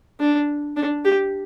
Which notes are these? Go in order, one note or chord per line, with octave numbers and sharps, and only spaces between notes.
D4
D4
G4